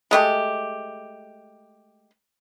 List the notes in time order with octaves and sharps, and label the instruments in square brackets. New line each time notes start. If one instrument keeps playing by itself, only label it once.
[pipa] G#3 A3 G4